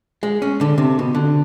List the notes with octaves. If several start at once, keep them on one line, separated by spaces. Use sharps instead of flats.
G#3
C#4
D3
C3
B2
D3